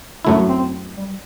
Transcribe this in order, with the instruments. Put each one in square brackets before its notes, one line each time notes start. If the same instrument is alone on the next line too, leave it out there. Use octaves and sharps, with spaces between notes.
[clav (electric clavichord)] F#2 F#3 A3 E4 [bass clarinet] D4
[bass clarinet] C4
G3